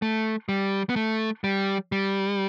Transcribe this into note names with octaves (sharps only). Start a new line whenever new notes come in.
A3
G3
B3
A3
G3
G3